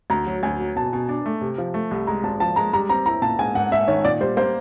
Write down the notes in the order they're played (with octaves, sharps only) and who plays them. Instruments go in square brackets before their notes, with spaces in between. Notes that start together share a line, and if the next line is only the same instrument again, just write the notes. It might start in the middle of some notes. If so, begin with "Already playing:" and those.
[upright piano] D2 [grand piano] A#5
[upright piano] F#3
[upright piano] D2 [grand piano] G#5
[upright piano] F#3
[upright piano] B2 [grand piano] A5
[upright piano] B2
D4
A3
C3
F3
A3
C2
[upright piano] G#3 [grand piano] A#5
[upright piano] G#1 [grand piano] A5
[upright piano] F3 [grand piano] A5
[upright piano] G#3 [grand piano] A#5
[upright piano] G3 [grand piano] A#5
[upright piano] C4 [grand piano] A#5
[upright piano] E4 [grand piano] A#5
[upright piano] A#2 [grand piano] A5
[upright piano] G#2 [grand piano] G#5
[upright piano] G#2 [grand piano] F#5
[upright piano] G#2 [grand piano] E5
[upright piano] D#3 [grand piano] C#5
[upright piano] A#2 [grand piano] D5
[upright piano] G3 [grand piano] C5
[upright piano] A#3 [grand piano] C5